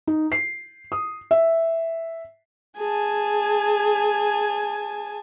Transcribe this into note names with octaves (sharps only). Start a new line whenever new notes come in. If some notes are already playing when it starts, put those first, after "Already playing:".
D#4
C7
D#6
E5
G#4 G#5 A5